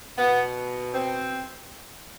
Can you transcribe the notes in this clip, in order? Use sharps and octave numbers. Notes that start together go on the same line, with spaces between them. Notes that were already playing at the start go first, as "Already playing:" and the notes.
B2 B3
C4